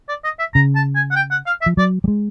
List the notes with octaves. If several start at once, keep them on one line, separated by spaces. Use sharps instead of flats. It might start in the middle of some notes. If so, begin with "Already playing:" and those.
D5
D#5
E5
C#3 A#5
A5
G#5
F#5
G5
F#5
F5
E5
F3
F#3 D5
G3
G#3